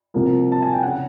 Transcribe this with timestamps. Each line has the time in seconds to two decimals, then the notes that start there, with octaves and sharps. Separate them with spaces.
0.14 C2 C3 F3 A#3
0.52 A5
0.62 G#5
0.73 G5
0.83 C#3 F#5